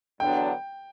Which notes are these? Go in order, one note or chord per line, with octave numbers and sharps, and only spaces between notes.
E2 D3 F#3 B3 D4 G5